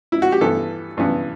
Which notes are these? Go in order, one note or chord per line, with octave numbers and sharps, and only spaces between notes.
E4
F#4
G4
G2 E3 B3 A4
G2 E3 B3